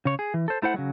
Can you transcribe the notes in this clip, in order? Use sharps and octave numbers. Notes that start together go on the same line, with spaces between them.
C#3 C#5
G#4
E3
A4 C5
A3 E4 C5 F#5
C#3 F#3 G#3